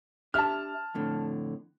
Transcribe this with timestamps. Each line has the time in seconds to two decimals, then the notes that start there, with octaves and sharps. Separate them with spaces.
0.34 D4 G4 E5 A5 F6
0.95 F2 A2 D3